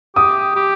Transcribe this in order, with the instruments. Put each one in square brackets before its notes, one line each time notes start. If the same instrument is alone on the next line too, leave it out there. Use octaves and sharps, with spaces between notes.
[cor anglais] G4 [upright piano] D#6
[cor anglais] G4